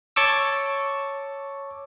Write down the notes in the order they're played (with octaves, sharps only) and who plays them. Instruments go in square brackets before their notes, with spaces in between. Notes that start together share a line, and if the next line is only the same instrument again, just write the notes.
[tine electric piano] C#5 A5 C#6 D6 E6